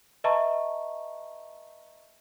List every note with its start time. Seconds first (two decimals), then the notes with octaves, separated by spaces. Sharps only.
0.24 B4 D#5 E5 A5 A#5 C#6